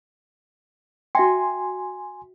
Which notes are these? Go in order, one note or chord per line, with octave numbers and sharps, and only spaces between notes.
F#4 E5 G5 G#5 C6